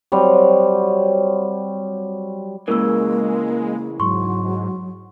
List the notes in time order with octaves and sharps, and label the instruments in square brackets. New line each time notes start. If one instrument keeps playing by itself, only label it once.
[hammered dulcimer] F#3 G3 C4
[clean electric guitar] C#3 E3 [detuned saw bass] G#3 [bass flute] A#3 [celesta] A#4 E6
[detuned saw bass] G#2 [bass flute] F#3 [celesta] C6 C#6